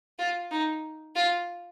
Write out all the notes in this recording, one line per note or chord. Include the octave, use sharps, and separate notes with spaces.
F4
D#4
F4